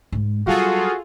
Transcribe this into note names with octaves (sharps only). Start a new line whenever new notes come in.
G#2 G#3
F#3 G3 F4 F#4 G#4 A4